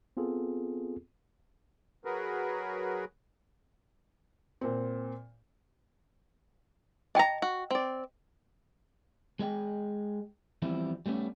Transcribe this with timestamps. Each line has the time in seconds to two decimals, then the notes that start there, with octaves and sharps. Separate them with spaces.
0.17 B3 C4 F4 G#4 A4
2.05 F#3 F#4 G#4 A#4 B4
4.61 A#2 C4
7.15 D4 D#5 G5 A5 A#5
7.42 F#4
7.71 C4 D5
9.39 G#3 G#4 D#5 G5
10.62 E3 F3 G3 B3 C4 E4
11.06 G3 A3 B3 C#4